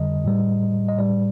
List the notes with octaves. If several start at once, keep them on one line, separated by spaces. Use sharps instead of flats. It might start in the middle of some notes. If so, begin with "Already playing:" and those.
Already playing: F2 D3 G3 D#5
A2 G3
D#5
A2 G3 D5